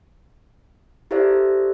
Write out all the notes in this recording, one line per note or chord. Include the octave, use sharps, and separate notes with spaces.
E4 G4 A4 C5 D5 E5